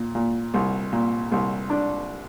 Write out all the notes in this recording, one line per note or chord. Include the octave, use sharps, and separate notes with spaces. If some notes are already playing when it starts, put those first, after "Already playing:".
Already playing: A#2
A#2
C2
A#2
C2
D4